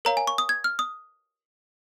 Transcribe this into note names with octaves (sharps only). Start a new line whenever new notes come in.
A#4 C#5 F5 A#5
G#5
C#6
D#6
G#6
F6
D#6